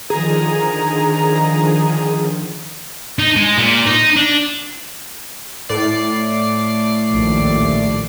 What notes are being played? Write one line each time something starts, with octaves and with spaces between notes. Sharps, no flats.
D3 D#3 F3 G#4 A#5
D#4
G#3
A#2
D#4
D4
A2 D5 C7
A#1 D#2